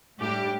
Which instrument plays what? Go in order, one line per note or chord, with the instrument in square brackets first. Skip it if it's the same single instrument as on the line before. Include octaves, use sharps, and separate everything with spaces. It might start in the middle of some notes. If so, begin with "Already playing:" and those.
[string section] A2 G3 D4 G4